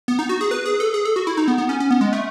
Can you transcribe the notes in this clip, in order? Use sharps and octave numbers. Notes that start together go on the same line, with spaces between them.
B3
D#4
F#4
G#4
B4
G#4
A4
G#4
A4
F#4
E4
D#4
B3
B3
C#4
C#4
B3
G#3
A3